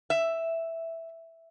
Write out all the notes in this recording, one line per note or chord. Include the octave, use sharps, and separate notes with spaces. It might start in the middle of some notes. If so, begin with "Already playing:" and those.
E5